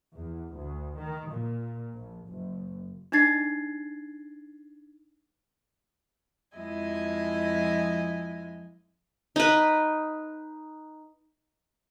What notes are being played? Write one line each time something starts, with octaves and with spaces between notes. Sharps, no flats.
E2
D2
D#3
A#2
A#1
F#1
D4 D#4 G#6 A6 C7
F2 F3 G#3 E4 D#5 G#5
D#4 B4